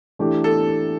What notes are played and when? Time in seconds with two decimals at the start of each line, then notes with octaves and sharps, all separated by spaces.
0.19 E3 A3 D4 G4
0.44 A4